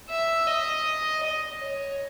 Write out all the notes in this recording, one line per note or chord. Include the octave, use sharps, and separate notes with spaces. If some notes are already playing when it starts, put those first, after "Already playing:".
E5
D#5
D#5
C#5